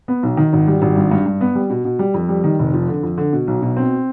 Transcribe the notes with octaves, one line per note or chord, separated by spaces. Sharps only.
B3
B1
D#3
G#1
G3
G#1
G2
G2
G2
B3
G3
B2
B2
G3
F2
G3
D#3
F1
F3
D3
F2
D3
B2
B1
B2
C4